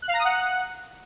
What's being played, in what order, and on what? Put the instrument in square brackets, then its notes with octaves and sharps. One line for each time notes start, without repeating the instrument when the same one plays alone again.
[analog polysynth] F#6
F5
A#5
D#6
F#5